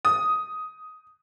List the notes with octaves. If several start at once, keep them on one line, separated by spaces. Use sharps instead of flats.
D#6